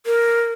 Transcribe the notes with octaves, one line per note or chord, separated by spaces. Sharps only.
A#4